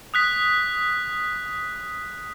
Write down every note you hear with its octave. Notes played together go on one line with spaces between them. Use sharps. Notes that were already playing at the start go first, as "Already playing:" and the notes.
D#6 F#6 B6